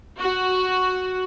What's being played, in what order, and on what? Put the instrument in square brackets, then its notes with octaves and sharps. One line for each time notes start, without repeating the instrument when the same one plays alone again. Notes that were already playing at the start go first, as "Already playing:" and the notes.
[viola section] F#4